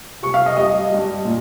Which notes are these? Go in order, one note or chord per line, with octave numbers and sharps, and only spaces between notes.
C3 G3 C#6
F5
D#5
G2 G3 D#5
G2 G3
A#2